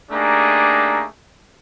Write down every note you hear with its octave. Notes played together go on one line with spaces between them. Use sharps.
A3 A#3 D4 D#4 G4 G#4